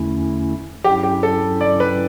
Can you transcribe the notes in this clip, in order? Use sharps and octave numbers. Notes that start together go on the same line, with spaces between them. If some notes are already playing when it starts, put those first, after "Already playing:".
Already playing: E2 D3 A3 C#4 E4
G2 F#3 C#4 E4 G4
G4
A4
D5
B4